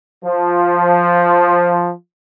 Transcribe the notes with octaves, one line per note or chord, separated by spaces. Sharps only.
F3